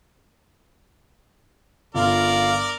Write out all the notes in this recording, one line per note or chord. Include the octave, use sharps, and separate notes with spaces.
G1 F4 A#4 D5 F5